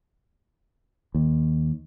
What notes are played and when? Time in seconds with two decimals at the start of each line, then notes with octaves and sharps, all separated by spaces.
1.15 D#2